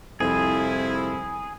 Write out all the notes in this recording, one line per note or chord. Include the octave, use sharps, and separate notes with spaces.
C2 F2 F3 C4 E4 G#4